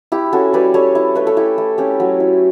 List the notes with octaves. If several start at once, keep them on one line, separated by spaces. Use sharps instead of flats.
E4 G4
C#4 F#4 A4
G3 B4 D5
G3 A4 C#5
E4
A3 B4
A4
E4 G4
A3
C#4 G4
F#3
E4